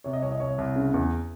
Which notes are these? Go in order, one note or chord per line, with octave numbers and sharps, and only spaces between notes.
C3 C#5
D#5
C2 C#5
D#5
C2 C#5
C2
C#3
E2